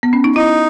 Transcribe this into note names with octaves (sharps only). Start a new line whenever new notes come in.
B3
C#4
D#4
D#4 E4